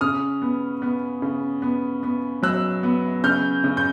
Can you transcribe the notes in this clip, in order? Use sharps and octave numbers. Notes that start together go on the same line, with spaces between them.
C#3 D#6 F6
B3
B3
C#3
B3
B3
F#3 E6 F#6
B3
C#3 F6 G6
C#3
G6